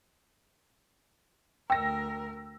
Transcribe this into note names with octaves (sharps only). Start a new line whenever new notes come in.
D2 A#4 G5 E6 A#6